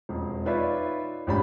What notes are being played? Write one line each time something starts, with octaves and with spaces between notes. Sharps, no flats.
E1 F2
D#4 F4 B4 C#5 D5 E5
A#1 G#2 C#4 D4 G4 B5